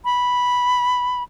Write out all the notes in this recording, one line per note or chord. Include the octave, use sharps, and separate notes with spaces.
B5